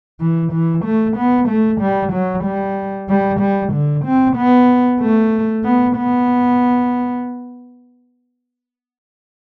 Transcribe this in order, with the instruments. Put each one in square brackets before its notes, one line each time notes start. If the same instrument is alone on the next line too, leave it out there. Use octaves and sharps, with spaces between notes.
[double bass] E3
E3
A3
B3
A3
G3
F#3
G3
G3
G3
D3
C4
B3
A3
B3
B3